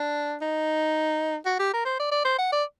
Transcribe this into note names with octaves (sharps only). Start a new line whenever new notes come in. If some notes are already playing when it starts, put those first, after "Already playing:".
Already playing: D4
D#4
F#4
G4
A#4
C5
D5
D5
C5
F#5
D5